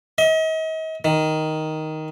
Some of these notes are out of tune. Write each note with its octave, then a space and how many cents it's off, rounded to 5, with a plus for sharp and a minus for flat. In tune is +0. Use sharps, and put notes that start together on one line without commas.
D#5 +40
D#3 +5